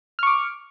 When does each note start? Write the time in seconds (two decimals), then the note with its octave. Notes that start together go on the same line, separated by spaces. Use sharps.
0.19 F6
0.23 C#6
0.27 D6